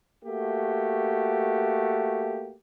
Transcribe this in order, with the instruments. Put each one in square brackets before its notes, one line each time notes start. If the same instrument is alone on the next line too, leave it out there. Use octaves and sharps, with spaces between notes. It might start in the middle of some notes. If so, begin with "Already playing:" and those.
[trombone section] A3 A#3 F#4 G4